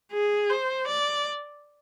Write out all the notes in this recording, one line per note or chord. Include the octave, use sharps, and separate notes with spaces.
G#4
C5
D5